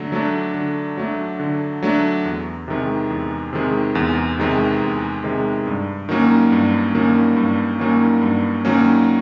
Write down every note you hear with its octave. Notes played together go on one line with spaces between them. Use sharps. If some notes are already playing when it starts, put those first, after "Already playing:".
Already playing: D3 F#3 A3
F#3 A3 D4
D3
F#3 A3 D4
D3
F#3 A3 D4
E2
C3 D#3 G#3
E2
C3 D#3 G#3
E2
C3 D#3 G#3
E2
C3 D#3 G#3
G2
D#3 F#3 A#3 C#4
G2
D#3 F#3 A#3 C#4
G2
D#3 F#3 A#3 C#4
G2
D#3 F#3 A#3 C#4